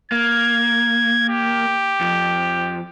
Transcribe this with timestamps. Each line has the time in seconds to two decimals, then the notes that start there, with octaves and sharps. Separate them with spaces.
0.12 A#3 G#6
1.29 G4
2.01 F2